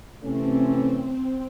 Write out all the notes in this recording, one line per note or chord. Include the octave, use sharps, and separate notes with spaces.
C3 E3 A3 C4 C#4